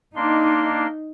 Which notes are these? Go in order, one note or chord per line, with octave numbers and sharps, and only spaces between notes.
A#3 D4 D#4 C6